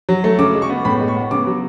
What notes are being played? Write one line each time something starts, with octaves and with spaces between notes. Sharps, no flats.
F#3
A3
C#3 D6
G#3
C#6
B3
A2 B5
G#3
C#6
B3
C#3 D6
F#3